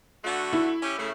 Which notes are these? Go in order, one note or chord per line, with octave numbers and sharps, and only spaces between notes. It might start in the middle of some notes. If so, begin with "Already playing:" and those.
D3 A3 F#4
E4
C#4 G4
C#3 A3